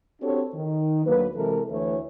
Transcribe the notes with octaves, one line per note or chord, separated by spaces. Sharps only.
C4 D4 F#4 G4 A4 C#5
D#3
D2 F#3 A#3 B4
C3 E3 G#3 A4 A#4
D2 E3 A3 B4 C#5